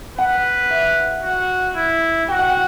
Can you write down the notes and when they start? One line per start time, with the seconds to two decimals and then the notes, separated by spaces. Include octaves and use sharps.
0.18 B4 F#5
0.71 E5
1.23 F#4
1.76 E4
2.29 F#4 G5
2.39 F#5
2.49 G5